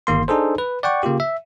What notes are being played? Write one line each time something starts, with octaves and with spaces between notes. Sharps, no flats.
G1 D#3 A#3 C6
D4 D#4 G#4 A4 C5
B4
D5 F#5 G5 C#6
C#3 A#3 F4 G4
E5